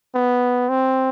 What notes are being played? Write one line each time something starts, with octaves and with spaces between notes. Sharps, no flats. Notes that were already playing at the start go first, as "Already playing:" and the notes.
B3
C4